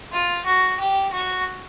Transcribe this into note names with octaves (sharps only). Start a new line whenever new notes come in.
F4
F#4
G4
F#4